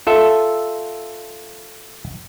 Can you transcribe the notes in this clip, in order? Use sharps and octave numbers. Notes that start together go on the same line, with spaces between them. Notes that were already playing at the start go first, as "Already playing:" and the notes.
F4 A4 E5